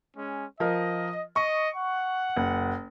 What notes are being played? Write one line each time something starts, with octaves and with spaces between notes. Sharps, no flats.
G#3 C#4
F3 A#4 D#5
D#5 C#6
F#5
F#1